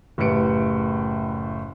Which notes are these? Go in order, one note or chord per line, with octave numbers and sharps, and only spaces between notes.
F#1 A2 G4 B4 C#7 D7